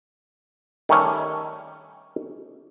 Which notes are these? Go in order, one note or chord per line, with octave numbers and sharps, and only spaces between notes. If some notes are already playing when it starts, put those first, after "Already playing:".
D#3 G3 A3 C#4